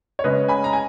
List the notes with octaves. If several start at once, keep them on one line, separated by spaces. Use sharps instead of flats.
C#5
C#3 G#3 C#4 B4 D#5
G#5 B5
A#5
G#5